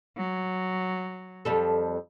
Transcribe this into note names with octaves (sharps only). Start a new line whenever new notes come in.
F#3
F2 G3 A4